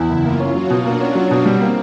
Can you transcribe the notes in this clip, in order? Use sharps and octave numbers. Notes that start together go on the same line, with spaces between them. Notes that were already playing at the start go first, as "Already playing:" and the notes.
Already playing: E2 E4
F#1
A#3 F4
C#4
F#3 F#4
B2
A#3 D4
C#4
F#3
B2
G3 C4
A#3